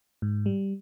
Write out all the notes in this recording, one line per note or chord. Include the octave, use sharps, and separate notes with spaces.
G#2
G3